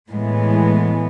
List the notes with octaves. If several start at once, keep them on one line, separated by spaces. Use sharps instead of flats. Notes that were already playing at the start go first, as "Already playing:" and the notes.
A2 E3 G#3 B3